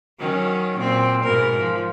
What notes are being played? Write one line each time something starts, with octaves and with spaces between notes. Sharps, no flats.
D#3 F#3 C#4
A#2 C4
G#2 B2 A#4
F3